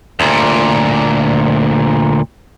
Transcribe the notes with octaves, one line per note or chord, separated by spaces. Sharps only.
D2 A#2